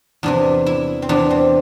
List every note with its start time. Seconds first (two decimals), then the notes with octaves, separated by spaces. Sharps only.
0.23 E2 C3 E3 D4
0.66 E4
1.02 C4
1.09 E2 C3 E3 D4
1.30 C4